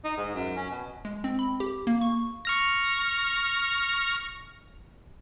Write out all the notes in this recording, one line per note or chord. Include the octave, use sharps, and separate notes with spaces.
D#4
G#2
F#2
C#4
B2
G#3
C4
B5
G4
A#3
C#6
C#6 F6 A#6